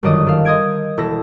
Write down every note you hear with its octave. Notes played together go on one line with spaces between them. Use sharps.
G1 F#2 D#3 D5 D#5 D#6
D#3 A4 F5
D#5 C6 D#6 G6 G#6 D7
E1 E4 A4 A#6